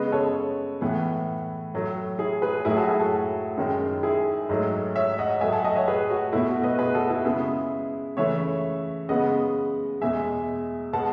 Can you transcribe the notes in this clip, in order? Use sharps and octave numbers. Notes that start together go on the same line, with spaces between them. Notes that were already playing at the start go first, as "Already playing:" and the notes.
Already playing: C#3 G#3 B3 B4 D#5
A4 C#5
A2 E3 B3
A2 F#3 A3
E4 G#4
G#4 B4
A2 F#3 A3 E4 G#4
F#4 A4
E4 G#4
F#4 A4
F#2 D#3 G#3
E4 G#4
G#2 F#3 A3
C#5 E5
D#5 F#5
A2 F#3 A3 E5 G#5
F#5 A5
D#5 F#5
C#5 E5
G#4 B4
F#4
B2 A3 E4
F#4
B4 D#5
G#4 B4
F#4 A4
E4 G#4
C#3 G#3 B3 E4 G#4
C#3 E3 A3 C#5 E5
C#3 G#3 B3 D#5 F#5
E2 B2 G#3 E5 G#5
B2 G#3 B3 F#5 A5